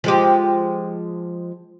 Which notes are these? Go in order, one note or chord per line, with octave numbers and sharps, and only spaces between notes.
F3 G#3 G4